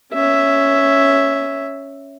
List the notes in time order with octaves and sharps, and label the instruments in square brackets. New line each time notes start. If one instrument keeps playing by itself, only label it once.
[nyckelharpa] C#4 E5